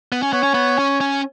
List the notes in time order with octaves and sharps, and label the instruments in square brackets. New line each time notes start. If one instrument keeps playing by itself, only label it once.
[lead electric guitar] B3
C#4
[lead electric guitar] B3 [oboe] C#5
[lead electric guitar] C#4
B3
C#4
C#4